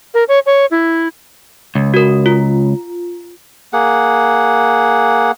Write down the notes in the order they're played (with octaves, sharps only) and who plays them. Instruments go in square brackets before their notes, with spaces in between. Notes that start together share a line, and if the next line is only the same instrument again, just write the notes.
[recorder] A#4
C#5
C#5
E4
[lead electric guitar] C#2
[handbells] F#4 A#4
F4
[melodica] A#3 G#4 F#5